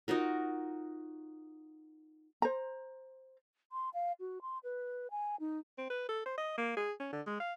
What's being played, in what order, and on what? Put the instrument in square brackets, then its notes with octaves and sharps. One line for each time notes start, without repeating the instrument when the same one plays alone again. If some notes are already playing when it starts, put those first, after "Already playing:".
[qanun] D#4 F4 F#4 A#4
[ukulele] C5 A#5
[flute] C6
F5
F#4
C6
B4
G#5
D#4
[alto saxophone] C4
B4
A4
C5
D#5
A#3
G#4
C#4
D3
G#3
F5